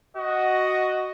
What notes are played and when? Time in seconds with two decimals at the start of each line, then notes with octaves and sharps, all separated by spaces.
0.17 F#4 D#5